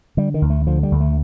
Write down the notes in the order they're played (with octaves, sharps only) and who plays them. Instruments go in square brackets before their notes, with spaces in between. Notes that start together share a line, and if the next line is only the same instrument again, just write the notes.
[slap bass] D3 G3
D#3
D2
A3
D3 F3
G3
D2
A3